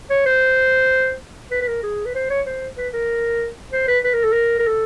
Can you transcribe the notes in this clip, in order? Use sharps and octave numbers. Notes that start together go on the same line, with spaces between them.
C#5
C5
B4
B4
A#4
G#4
B4
C5
C#5
C5
B4
A#4
C5
B4
B4
A#4
A4
A#4
A#4
A4